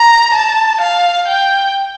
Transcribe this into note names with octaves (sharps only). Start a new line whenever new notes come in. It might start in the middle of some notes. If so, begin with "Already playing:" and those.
Already playing: A#5
A5
F5
G5